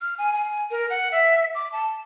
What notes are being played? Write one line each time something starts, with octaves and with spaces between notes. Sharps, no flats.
F6
G#5
G#5
A#4
F#5
E5
D6
A5